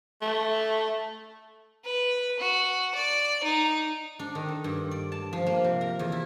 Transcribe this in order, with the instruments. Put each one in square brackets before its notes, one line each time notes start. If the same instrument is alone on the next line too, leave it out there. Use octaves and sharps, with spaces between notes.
[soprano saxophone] A3
[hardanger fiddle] B4
F#4
D5
D#4
[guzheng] D4
D#3
A4
G2
D5
A5
F3
A#3
C3
A#4
E2
E4